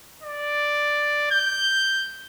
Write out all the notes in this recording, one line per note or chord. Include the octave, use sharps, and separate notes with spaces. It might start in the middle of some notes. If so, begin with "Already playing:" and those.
D5
G6